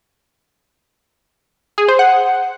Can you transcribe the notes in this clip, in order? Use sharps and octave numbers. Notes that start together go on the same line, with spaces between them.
G#4
C5
F#5